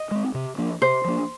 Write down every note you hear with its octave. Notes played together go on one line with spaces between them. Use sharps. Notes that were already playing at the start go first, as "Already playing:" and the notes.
Already playing: D#5
G#3 C4
C3
F3 A#3 D4
C3 C5
F3 A#3 D4